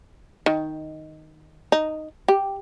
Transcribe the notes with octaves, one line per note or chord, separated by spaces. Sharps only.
D#3
D#4
G4